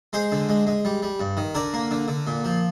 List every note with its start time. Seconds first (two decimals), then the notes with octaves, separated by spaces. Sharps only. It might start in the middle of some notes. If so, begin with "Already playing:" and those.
0.13 G#3 G#4 C5
0.32 D3
0.49 G#3
0.67 G#3
0.85 G3
1.03 G3
1.20 G2
1.37 D#3
1.55 D3 A#4 D5
1.74 A#3
1.91 D3
2.08 D3
2.27 A#2
2.44 F3